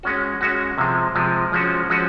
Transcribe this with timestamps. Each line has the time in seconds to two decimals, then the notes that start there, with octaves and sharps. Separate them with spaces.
0.03 G#3 C#4 F#4
0.41 G#3 C#4 F#4
0.78 C3 F3 G#3
1.15 C3 F3 G#3
1.52 F3 G#3 C#4 F#4
1.90 F3 G#3 C#4 F#4